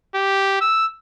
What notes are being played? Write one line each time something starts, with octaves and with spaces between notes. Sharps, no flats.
G4
E6